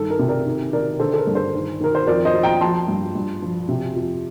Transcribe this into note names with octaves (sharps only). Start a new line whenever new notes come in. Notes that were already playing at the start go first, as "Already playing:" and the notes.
Already playing: G2 D#3 A4
A#4
C3
A#4 D5
D#3
D#3 A#4 D5
D3 A4 C5
A4
A#4
G2
A4 C5
D#3
D#3 A#4
C5
F2 A#4 D5
C5 D#5
F2
G5 A#5
F3 A5 C6
G2
G2
F3
C3
F2